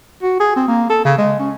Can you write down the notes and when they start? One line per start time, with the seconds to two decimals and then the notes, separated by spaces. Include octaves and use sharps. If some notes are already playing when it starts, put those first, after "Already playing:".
0.23 F#4
0.40 G#4
0.56 C4
0.68 A#3
0.90 A4
1.05 C#3
1.18 G#3
1.39 C#4